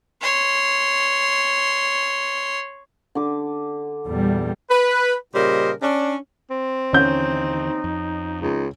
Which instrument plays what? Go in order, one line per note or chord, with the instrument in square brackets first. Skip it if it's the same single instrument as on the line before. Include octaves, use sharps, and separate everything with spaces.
[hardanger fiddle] C#5 C6
[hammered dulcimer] D3 D6
[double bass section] E2 A#2 G3
[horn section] B4
A#2 C#3 G3 A#4 C5 D#5
C#4 D4
[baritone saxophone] C4
[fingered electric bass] D#2 D3 E3 [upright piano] C#4 G6 [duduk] D#4
[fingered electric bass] F2
[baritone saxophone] C#2 [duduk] D#4